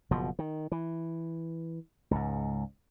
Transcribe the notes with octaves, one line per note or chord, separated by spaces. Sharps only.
F#1 B2 F3
D#3
E3
C#2 G#2